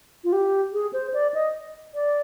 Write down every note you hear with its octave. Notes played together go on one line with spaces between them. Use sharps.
F4
G4
G#4
C5
D5
D#5
D5